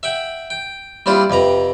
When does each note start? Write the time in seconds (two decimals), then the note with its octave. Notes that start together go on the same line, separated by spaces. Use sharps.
0.03 E5 F#5 G5
0.50 G5
1.06 G3 C4 D4 E4 F4
1.30 F2 C3 B4 A#5